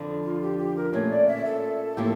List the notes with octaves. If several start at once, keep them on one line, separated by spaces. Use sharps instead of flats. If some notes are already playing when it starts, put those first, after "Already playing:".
Already playing: F2 D3 F3
F4
G4
G4
A#4
A#2 A3 C#4 C#5
D5
E5
A4
A2 F3 A#3 E4 G4